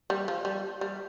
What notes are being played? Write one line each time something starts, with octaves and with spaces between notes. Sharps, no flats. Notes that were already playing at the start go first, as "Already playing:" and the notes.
G3
F3
G3
G3